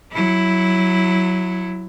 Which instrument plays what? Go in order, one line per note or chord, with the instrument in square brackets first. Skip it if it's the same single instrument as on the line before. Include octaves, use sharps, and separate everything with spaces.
[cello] F#3 E4